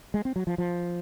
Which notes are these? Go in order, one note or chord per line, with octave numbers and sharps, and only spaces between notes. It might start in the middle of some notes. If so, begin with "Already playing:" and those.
G#3
C4
F#3
F3
F3